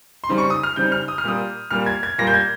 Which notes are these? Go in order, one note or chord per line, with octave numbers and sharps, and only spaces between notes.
C6
C#3 G3 C4 D#4
C#6
D#6
F6
C#3 G3 C4 D#4 G6
F6
D#6
F6
A#2 G3 A#3 D#6
A#2 G3 A#3 F6
G#6
G#6
A#2 G3 A#3 A#6
G6
G#6